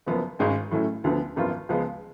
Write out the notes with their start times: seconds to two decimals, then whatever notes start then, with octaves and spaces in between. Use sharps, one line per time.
0.06 F#1 F#2 F3 B3
0.39 G#1 G#2 G#3 C#4
0.71 A2 F#3 A3 C#4
1.04 D2 D3 F3 B3
1.36 G#1 F#2 F3 B3 F4
1.69 C#2 C#3 F3 G#3 B3